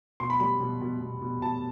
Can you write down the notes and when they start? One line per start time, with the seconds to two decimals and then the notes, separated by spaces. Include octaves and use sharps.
0.20 B2 C6
0.30 B5
0.40 G3 B5
0.61 B2
0.81 B2
1.01 B2
1.21 B2
1.41 B2 A5